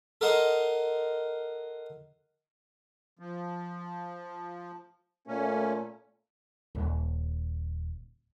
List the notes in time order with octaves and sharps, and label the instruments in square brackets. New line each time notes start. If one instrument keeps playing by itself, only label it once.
[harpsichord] A4 A#4 C5 D#5 F#5
[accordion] F3
[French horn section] A#2 A3 [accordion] C#4
[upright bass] D#1